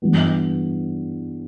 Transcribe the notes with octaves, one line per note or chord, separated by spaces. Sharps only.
G2 E3 B3